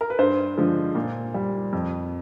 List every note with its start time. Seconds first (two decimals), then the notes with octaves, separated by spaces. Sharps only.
0.01 A#4
0.10 B4
0.19 G2 C5
0.57 D3 F3 G#3
0.95 A#2
1.34 G3
1.73 F2